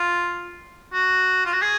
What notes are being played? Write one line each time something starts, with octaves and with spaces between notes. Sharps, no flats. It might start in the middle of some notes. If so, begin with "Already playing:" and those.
Already playing: F4
F#4
F4
F#4
G#4